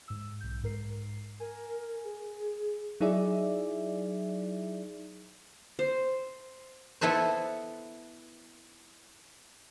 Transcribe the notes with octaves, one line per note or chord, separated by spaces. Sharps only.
G#2 E6
B1 G6
G#2 A#4 C7
A#4 G#5
G#4
F#3 D#4 E4 G#4 D5 E5
C5
B3 E4 A4 B4 C5